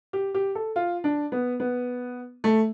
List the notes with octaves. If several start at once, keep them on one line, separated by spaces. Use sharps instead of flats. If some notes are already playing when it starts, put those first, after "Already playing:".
G4
G4
A4
F4
D4
B3
B3
A3